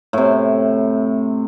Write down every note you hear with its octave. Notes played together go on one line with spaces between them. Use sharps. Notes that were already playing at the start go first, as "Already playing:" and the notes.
A2 C3